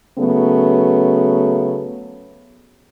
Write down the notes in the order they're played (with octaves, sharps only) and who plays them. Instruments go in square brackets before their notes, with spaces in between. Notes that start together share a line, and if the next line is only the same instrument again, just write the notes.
[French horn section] C#3 F#3 A3 B3